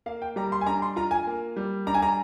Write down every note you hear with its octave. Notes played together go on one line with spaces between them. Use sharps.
A#3 F5
G5
G3 A#5
C6
G#5
D4 A#5
C6
F4 A#5
G#5
A#3
G3
D4 A#5
G#5
A#5